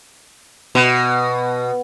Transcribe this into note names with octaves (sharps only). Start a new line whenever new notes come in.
B2